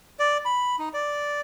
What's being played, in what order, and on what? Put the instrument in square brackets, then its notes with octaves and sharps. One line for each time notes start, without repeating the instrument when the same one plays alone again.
[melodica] D5
B5
D#4
D5